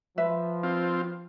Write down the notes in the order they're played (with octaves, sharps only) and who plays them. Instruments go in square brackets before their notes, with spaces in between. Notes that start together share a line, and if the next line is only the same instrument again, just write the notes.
[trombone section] F3 [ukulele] B4 E5
[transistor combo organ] C4 F4